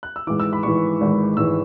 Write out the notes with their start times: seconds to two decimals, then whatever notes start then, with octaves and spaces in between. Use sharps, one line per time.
0.03 F#6
0.16 E6
0.27 G#1 G#2 E3 D6
0.40 E6
0.53 B5
0.63 G#1 G#2 E3 C#6
1.01 G#1 G#2 E3
1.37 G#1 G#2 E3 E6